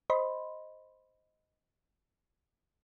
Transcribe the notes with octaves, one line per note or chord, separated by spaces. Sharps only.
C5 D#5 B5 C6